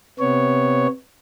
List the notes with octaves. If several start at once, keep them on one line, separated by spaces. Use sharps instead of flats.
C3 B3 C#5